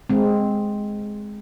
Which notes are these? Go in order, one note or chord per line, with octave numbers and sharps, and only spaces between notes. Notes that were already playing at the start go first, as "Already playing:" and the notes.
G#3 C4